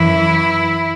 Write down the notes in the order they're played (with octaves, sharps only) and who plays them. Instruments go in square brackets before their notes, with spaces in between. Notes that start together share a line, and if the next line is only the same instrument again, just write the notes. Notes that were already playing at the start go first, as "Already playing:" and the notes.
Already playing: [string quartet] F#2 E3 E4